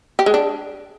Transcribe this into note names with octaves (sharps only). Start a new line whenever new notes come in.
G4
G#3
D4